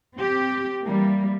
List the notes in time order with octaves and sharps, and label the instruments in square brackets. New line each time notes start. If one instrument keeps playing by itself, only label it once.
[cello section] C4 G4
E3 G3 A#3